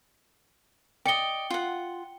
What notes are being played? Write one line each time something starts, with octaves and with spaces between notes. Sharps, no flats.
D5 D#5 G5 C#7 G7
F4 F#5